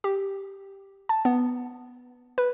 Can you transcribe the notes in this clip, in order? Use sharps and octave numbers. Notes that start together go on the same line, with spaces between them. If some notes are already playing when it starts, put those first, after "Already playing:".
G4
A5
B3
B4